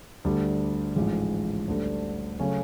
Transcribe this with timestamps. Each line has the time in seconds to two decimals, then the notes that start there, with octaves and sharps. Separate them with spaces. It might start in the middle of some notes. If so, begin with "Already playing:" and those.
0.24 D2 D3 G3
0.96 A1 G#2 F3 G#3
1.68 D2 D3 G3
2.39 C#3 F#3 A3 C#4